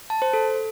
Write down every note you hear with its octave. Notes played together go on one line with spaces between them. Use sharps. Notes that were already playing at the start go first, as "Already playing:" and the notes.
A5
C5
A4